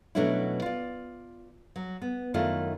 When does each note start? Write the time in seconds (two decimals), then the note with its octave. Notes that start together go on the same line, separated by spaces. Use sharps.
0.15 B2 F#3 A3 C#4 D4 E4
0.62 F4 D5
1.76 F#3
2.02 B3
2.34 F#2 D#3 A3 E4 F4